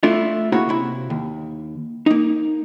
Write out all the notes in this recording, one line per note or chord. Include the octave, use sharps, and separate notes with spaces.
A3 D4 E4 F4
C#3 A#3 E4 F#4 C#5 A#5
C3 E4
D#2
A#3 D#4